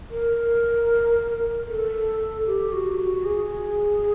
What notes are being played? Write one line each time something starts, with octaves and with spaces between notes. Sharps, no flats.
A#4
A4
G4
F#4
F#4
G#4